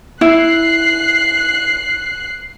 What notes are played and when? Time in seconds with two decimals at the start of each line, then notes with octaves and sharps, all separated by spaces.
0.21 E4 F#6 C7